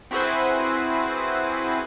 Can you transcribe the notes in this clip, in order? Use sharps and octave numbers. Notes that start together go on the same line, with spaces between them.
C4 E4 F#4 G#4 B4 C5